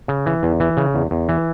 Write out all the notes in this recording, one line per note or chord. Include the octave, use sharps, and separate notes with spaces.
C#3
E3
E2
E3
C#3
E2
E2
E3